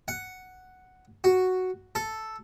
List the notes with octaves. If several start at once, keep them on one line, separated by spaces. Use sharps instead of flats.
F#5
F#4
A4